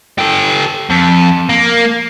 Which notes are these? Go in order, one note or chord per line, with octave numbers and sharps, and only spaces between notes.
G4 A4
F2
A#3